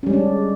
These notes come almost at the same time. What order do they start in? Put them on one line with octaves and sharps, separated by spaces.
C#4 G3 G#3 D4